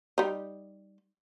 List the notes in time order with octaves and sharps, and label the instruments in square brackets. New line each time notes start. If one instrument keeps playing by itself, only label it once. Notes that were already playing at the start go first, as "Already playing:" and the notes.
[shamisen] G3 D#4